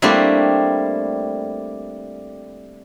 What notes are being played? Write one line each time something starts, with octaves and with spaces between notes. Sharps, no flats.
G3 A3 A#3 C4 D4 E4